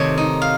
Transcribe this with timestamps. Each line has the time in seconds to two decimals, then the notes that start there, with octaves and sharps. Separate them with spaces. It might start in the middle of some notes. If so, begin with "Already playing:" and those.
Already playing: C3 D#3 A3 C#5
0.18 D#4
0.42 F5